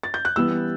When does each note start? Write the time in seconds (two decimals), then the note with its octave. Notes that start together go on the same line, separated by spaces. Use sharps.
0.03 A6
0.14 G6
0.25 F#6
0.36 E3 G3 B3 E6